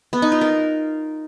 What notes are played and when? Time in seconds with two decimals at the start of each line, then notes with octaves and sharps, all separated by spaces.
0.13 B3
0.22 D#4
0.32 F4
0.41 A#4